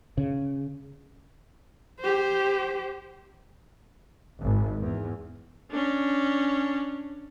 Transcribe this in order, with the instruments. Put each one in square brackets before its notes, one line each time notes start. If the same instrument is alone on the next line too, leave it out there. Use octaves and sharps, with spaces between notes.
[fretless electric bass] C#3
[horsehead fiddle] G4 C5
[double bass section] G#1
E2
[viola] C#4 D4